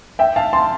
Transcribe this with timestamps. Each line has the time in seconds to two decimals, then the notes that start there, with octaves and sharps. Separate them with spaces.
0.19 E5 G5
0.36 F5 A5
0.53 A5 C6